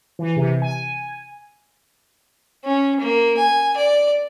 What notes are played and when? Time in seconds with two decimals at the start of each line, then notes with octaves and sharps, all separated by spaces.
0.19 E3
0.37 C3
0.62 G#5
2.64 C#4
3.00 A#3
3.37 G#5
3.77 D5